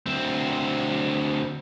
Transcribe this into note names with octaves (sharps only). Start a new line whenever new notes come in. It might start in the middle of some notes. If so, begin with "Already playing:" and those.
D2 C4